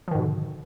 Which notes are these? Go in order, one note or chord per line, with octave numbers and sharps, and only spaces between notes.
G#2 B2 D3 D#3 F3